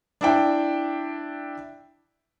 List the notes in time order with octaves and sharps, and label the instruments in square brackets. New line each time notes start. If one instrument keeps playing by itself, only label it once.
[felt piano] D4 E4 G5